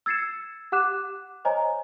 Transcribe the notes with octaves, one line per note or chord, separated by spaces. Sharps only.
E6 G#6 A6 C7 C#7 E7
G4 F#5 D6 F#6 E7
C5 C#5 D#5 G#5 A#5